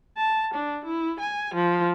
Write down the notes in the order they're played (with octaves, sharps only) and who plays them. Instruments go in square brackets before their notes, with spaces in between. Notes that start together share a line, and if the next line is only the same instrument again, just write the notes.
[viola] A5
D4
E4
G#5
F3